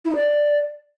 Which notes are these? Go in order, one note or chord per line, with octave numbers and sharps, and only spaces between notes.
E4
D#4
D5